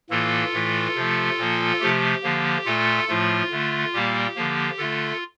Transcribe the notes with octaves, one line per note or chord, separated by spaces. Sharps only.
A2 E3 A#3 F4 A4
A2 E3 A3
C3 F3 A3
A#2 F3 A#3
C3 F3 A3 G4
D3 F3 A#3
A#2 A3 F4 A4
A2 F3 A3 F4
D3 A3
A#2 G3 A#3 G4
D3 F3 A#3
D3 A3 F4 A4